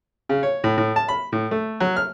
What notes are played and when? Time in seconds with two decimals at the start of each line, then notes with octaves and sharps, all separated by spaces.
0.29 C#3
0.43 C#5
0.64 A2
0.78 A2
0.96 A5
1.08 B5
1.32 A2
1.51 A3
1.80 F#3
1.96 F6